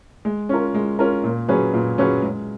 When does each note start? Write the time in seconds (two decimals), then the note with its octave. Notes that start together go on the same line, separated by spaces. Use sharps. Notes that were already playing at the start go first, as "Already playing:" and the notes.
0.25 G#3
0.49 C#4 F4 A#4
0.74 G#3
0.99 C#4 F4 A#4
1.24 A#2
1.48 F#3 C#4 G#4 B4
1.73 A#2
1.98 F#3 C#4 G#4 B4
2.22 G#3